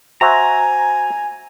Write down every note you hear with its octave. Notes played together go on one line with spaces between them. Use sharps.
F#4 C5 E5 G#5 A#5